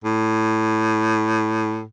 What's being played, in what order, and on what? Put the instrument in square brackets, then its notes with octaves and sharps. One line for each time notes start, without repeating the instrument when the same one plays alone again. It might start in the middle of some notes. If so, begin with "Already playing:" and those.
[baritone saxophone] A2